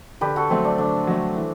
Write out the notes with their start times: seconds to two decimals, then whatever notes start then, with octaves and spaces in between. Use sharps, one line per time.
0.21 D3 G4 B4
0.36 F#4 A4
0.50 F#3 A3 C4
0.65 D4
0.78 D3 D4
1.07 F#3 A3
1.36 E3